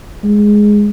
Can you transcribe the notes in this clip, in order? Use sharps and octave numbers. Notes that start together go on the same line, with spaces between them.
G#3